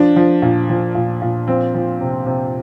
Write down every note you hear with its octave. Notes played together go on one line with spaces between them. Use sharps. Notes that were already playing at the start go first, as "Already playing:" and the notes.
Already playing: F3 D4
F3
A#2
F3
A#2
A#2
F3 C4
F3
C3
C3